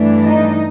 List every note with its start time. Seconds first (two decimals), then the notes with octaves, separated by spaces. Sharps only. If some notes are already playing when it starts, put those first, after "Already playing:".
Already playing: G2 E3 A3 D4
0.25 D#4 D#5